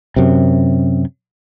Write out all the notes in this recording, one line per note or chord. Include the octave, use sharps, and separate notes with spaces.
F#2 C3